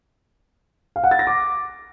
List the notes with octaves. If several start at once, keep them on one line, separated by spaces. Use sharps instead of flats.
F5
F#5
A6
A#6
D6